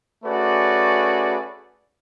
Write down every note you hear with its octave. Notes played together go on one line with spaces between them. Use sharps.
A3 C#4 F#4 G#4 B4 D5